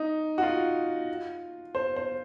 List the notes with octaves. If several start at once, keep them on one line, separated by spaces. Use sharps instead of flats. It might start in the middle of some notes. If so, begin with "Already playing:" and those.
Already playing: D#4
F#4
F4
C5
C5